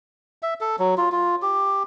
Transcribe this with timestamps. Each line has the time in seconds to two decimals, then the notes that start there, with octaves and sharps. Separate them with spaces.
0.43 E5
0.61 A4
0.79 F#3
0.98 F4
1.12 F4
1.42 G4